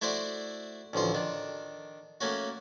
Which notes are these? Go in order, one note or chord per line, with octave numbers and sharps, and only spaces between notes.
A3 E4 F#4 C5 D5
A1 D2 F3 C5
D#3 D4
A3 A#3 C#4 F#4